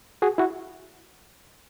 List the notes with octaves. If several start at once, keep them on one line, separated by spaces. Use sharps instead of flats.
F#4 G#4
E4 F#4